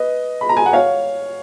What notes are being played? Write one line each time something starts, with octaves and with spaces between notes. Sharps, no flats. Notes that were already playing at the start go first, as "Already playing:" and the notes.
Already playing: B4 D#5
B5
A#5
G#5
F#5
C#5 F5